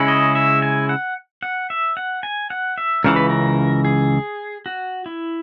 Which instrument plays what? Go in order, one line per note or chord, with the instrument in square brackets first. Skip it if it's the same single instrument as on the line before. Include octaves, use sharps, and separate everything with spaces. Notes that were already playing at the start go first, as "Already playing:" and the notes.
Already playing: [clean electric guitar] C#3 G#3 C#4 E4
[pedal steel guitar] D#5
E5
G#5
F#5
F#5
E5
F#5
G#5
F#5
E5
[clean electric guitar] C#2 C#3 E3 [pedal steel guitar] A#4
[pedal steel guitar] B4
A#4
G#4
F#4
E4